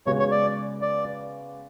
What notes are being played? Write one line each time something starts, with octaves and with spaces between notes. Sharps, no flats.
C#3 G#3 B3 F#4 C#5
C#5
D5
D5